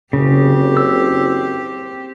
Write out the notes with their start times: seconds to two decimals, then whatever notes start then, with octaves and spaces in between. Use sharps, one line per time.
0.13 F#1 C#3 C4 G4
0.77 E6